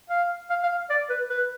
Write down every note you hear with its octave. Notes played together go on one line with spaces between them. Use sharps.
F5
F5
F5
D5
B4
B4